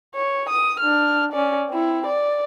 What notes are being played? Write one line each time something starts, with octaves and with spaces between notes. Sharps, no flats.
C#5
D#6
D4 F6
C#4 D5
C4 E4
D5